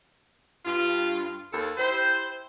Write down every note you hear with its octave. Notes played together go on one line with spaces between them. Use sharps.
G2 F4
D#2 A4
E4 G4 C5